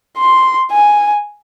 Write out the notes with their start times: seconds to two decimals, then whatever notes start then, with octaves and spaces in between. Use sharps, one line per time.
0.18 C6
0.72 G#5